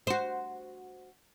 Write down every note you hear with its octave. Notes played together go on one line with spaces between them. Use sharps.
F#4 C5